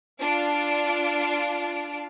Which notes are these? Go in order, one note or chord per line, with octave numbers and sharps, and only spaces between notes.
D4 F4 F5 A5 D7